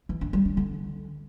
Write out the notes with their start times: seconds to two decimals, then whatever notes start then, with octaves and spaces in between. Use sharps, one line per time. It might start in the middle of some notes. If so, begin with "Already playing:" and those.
0.09 E3
0.21 D4
0.33 G3
0.45 D4
0.57 D3